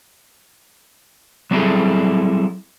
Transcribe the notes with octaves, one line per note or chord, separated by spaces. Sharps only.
F#3 G3 C4 E4 G#4 A4